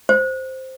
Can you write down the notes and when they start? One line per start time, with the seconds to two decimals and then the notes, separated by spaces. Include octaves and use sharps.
0.09 C5